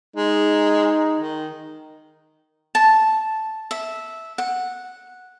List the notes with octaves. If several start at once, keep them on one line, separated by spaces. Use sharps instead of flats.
G#3 D#4
D#3
A5
E5
F#5